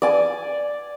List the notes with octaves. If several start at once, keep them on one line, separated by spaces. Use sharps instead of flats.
D5 G#5